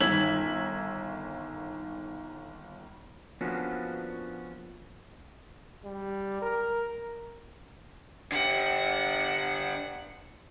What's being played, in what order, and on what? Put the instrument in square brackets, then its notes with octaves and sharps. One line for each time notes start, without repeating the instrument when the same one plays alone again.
[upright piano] G1 D#3 E6 G#6 B6 F#7
[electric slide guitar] F3 A#3 B3 C#4 D4 F#4
[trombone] G3
A#4
[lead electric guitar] D3 G4 [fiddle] F#5